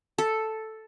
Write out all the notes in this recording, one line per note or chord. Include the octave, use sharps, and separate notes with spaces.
A4